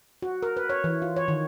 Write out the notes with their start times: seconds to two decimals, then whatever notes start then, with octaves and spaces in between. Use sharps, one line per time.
0.22 F#4
0.43 A#4
0.57 B4
0.70 C#5
0.84 E3
1.02 F4
1.17 C#5
1.28 D#3